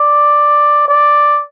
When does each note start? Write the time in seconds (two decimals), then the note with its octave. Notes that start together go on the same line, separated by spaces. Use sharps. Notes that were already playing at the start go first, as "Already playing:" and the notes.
Already playing: D5
0.88 D5